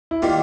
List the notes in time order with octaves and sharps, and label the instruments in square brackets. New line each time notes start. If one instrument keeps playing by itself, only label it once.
[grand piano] E4
[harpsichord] D#3 G3 A#3 [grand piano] F4